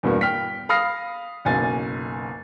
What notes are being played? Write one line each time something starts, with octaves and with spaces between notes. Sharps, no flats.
E2 G2 B2 A#3
G5 F6 B6
F5 B5 D#6 F6 A#6 C7
F#1 B1 G#5 A6